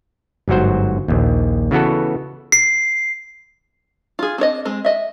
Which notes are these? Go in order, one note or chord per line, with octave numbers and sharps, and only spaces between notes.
G1 G#2 F#3 F#4 C5
A#1 D#2
C#3 E3 B3 F#4 A4
C7
F4 G#4
C4 D4 C#5 D#5
G#3 C4
D#5 E5